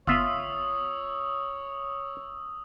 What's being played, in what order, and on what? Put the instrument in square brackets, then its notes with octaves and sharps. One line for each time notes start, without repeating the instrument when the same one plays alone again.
[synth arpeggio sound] G1 B3 C6 [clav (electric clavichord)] F4 E5 [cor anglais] C#5 [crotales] D#6 E6